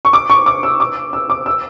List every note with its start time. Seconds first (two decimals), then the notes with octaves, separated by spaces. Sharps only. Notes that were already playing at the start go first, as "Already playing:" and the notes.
0.05 C#6
0.13 D6
0.30 C#6
0.46 D6
0.63 E6
0.80 D6
1.13 E6
1.30 D6
1.46 E6